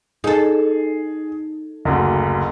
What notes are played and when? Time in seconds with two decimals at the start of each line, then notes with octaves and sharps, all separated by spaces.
0.24 D#4 G#4 A4
1.85 F#1 D2